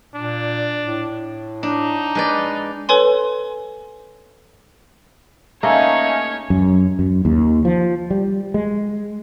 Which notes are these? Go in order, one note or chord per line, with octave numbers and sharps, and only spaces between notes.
A#2 D4
A2
D4 D#4
G#3 B4 D5
A4 B4 C#5 G#5 C6
A3 A#3 C#4 D#4 G#4 C#5 D#5 E5
F#2
F#2
D#2
F3
G3
G#3